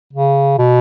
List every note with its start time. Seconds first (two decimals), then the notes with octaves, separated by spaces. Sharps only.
0.13 C#3
0.58 B2